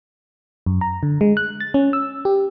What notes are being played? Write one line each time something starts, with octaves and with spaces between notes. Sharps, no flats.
F#2
A#5
D3
G#3
F#6
A6
C#4
E6
G4